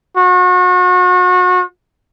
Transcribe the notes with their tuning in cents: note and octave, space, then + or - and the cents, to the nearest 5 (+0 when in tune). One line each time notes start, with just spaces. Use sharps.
F#4 -35